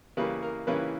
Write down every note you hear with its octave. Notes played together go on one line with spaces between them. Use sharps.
C#3 E3 G3 A#3 C#4 B4
A#4
C#3 E3 G3 A#3 C#4 B4